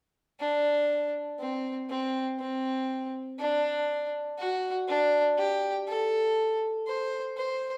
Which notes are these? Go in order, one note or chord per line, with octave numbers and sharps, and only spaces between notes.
D4
C4
C4
C4
D4
F#4
D4
G4
A4
C5
C5